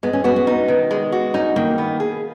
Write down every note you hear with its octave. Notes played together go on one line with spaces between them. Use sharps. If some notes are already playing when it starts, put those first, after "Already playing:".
G#3 B3
C#4
B3 F#4
B3
D#4
D#3
G#3
F#4
C#4 D#4
D#3 A#3
B3
G#4